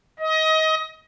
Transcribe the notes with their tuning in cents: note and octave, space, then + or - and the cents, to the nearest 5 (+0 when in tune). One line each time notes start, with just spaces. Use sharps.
D#5 +25